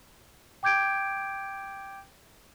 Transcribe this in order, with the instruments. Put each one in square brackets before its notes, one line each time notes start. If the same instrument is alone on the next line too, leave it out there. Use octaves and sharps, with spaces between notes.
[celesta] G5 D6 G6 G#6 D7